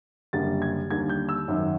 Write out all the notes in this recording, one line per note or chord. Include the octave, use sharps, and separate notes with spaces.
F#1 F#2 D3 G3 A#3 A6
G#6
D#2 D3 G3 A#3 G#6
G6
E6
G#1 F#2 D#3